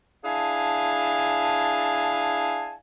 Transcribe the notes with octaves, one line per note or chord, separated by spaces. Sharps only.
D4 E4 G#4 F5 G#5 A5